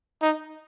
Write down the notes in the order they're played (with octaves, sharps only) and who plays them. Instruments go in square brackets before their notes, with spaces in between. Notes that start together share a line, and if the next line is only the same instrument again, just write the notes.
[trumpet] D#4